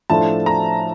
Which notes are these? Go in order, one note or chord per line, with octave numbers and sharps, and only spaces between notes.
A2 F3 A3 D4 F4 A5
A#5